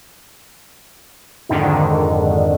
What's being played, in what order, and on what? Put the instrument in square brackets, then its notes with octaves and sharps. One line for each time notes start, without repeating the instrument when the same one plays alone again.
[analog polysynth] F2 G#2 D3 D#3